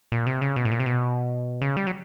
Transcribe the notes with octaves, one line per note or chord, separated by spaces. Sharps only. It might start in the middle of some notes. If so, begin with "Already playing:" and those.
A#2
C3
C#3
B2
A2
A#2
C3
B2
C#3
G3
F#3